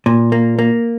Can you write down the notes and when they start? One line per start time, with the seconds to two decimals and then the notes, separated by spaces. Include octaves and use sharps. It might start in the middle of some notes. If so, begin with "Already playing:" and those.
0.06 A#2
0.32 A#3
0.59 A#3